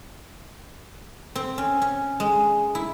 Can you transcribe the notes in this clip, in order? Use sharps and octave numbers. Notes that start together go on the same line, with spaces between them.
C4
C#4
C#4
G#3
E4